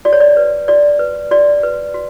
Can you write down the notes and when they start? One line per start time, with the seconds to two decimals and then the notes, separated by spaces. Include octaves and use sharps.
0.05 F#4 D5
0.13 C#5
0.20 D5
0.37 B4
0.68 F#4 D5
0.99 B4
1.31 F#4 D5
1.63 B4
1.94 F#4